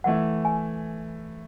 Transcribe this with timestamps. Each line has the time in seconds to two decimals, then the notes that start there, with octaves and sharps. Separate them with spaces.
0.04 E3 A3 E4 F#5
0.45 G#5